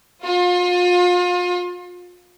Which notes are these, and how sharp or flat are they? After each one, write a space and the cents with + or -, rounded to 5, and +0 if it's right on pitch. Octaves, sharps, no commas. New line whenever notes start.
F4 +35